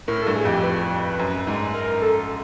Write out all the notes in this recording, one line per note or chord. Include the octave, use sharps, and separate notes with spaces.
A2 A#4
A4
G2
G#4
F2 G4
B4
F#2
G#2
A#4
A4